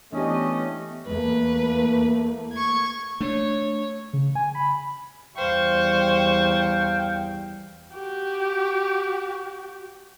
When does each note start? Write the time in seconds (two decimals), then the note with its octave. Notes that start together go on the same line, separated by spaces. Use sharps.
0.13 E3 A3 B3 C#4 D4 G4 D#5
1.07 E2 A3 A#3 B4
2.53 C#6 G#6
3.20 A3 D4 C#5
4.13 C#3
4.35 G#5
4.55 B5
5.37 E2 G3 C5 F5 G5 C#6
7.93 F#4 G4